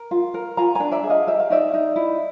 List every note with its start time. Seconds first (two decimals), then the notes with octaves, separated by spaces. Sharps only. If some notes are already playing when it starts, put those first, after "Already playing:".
Already playing: A#4
0.11 F4
0.34 A#4
0.57 F4 G#5 A#5
0.75 D4 G#5 A#5
0.92 D5 E5
1.03 G#4
1.10 D#5 F5
1.27 G4 E5
1.40 F5
1.50 D#4 D5 E5
1.74 D#4
1.96 E4